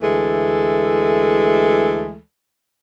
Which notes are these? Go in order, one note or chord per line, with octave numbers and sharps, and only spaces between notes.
D2 E3 G#3 A3 A4